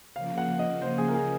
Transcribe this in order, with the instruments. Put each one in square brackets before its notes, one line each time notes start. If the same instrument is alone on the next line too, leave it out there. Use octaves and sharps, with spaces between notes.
[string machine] C#3 F3 A#3 [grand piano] F5
[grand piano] F#5
D#5
C5
G#4
A#4
G#4